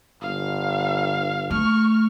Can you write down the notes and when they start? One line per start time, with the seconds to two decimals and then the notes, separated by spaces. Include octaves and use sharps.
0.21 G1 F5
1.51 A3 C#6 F6